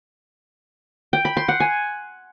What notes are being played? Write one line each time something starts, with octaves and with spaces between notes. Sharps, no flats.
G5
B5
C6
F#5
G#5